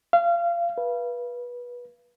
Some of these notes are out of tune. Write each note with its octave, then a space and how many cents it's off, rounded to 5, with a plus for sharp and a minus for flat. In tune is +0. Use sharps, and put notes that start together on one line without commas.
F5 -25
B4 -25